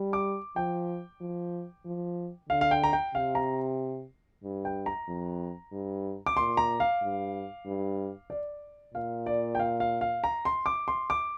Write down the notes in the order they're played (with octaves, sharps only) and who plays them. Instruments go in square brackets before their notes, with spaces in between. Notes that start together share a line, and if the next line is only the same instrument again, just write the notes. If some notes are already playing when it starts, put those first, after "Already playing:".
Already playing: [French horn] G3
[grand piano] D6
[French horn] F3 [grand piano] G5
[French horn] F3
F3
[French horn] D3 [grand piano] F5
[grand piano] F5
G5
A#5
G5
[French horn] C3 [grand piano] F5
[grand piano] A#5
[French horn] G2
[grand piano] G5
A#5
[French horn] F2
G2
[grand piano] D6
[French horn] A#2 [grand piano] C6
[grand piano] A#5
F5
[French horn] G2
G2
[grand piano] D5
[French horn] A#2 [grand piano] F5
[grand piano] D5
G5
F5
F5
F5
A#5
C6
D6
C6
D6